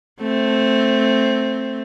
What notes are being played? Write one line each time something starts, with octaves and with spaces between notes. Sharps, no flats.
A3 C4